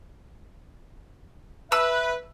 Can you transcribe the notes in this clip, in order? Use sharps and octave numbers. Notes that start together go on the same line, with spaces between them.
B4 E5 E6